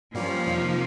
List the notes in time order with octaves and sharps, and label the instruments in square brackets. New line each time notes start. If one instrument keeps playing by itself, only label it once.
[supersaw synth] G2 G3 A#3 C#4 F4 [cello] F3
[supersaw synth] F2 C3 D#3 A#3